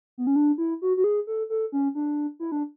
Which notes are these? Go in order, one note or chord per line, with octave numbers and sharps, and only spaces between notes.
B3
C#4
D4
E4
F#4
F#4
G#4
A4
A4
C#4
D4
E4
D4